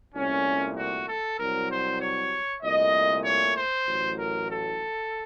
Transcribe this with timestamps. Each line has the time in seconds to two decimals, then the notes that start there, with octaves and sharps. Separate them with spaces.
0.15 C2 A#2 A3 C#4
0.77 F#4
1.09 A4
1.40 C2 C3 F#3 A#4
1.71 C5
2.01 C#5
2.63 C2 A#2 A3 D#5
3.25 C#5
3.56 C5
3.87 A1 A2 F#3
4.19 A#4
4.49 A4